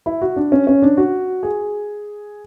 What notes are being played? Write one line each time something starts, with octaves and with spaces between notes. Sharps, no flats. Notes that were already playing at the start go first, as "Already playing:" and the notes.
E4
F#4
D4
C#4
C#4
D4
F#4
G#4